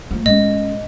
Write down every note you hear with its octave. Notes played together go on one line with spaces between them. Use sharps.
F3 A3
A2 G#3 C#4 D#5